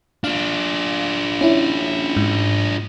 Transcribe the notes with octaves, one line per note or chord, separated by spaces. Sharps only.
D4 F4 F5
C#4 E4
G#2